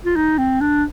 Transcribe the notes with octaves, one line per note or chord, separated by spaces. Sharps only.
F4
D#4
C4
D4